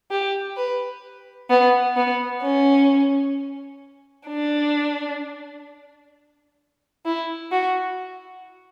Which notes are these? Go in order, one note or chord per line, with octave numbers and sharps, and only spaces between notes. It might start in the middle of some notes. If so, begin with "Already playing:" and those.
G4
B4
B3
B3
C#4
D4
E4
F#4